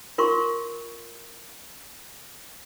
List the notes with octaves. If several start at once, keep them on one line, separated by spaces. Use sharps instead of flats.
F4 A#4 C6 C#6